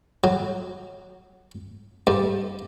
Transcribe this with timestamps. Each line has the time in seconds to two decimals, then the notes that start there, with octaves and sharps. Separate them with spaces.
0.24 F#3
2.07 G2